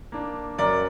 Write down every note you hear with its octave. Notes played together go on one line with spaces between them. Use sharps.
A#3 D4
F#2 A#4 D5